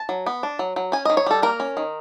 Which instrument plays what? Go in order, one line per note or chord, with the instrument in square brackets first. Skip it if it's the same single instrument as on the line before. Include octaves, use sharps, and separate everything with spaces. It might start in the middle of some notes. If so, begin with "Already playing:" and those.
Already playing: [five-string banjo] A5
F#3
B3
D4
F#3
F#3
C#4 G#5
D#5
D#3
C#5
G3 A4
A#3 A#4
C#4
D#3